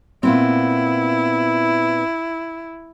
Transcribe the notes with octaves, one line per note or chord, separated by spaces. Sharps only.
A#2 B3 C4 E4